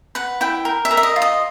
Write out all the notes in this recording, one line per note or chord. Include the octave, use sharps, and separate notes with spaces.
B4 F#5
E4 G5
A#4
E5
A#4
E5
D#5
F4
D#5